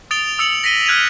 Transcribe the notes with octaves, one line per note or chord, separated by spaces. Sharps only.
D#6 A6 D7 F7 G7
D#6 E6 C#7 F7 F#7
A#6 B6 D#7 G7
F6 F#6 G#6 B6 D#7 F7